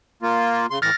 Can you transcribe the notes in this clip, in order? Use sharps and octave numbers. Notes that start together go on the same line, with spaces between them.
A#3 F4
C#3 C6
A2 E3 F6 A6 A#6